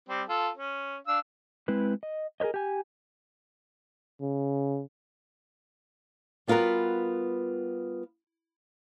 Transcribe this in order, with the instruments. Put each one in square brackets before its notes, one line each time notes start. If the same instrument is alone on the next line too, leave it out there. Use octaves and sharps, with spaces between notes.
[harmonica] G3 C4
F4 A4
C#4
D4 F5 E6
[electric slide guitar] G#3 C4 E4 B4
D#5
G#4 A#4 B4 C#5 D#5
G4 G#5
[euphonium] C#3
[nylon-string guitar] G3 B3 F4 F#4 A#4 B4